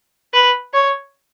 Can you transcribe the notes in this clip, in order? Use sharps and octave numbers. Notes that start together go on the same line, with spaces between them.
B4
C#5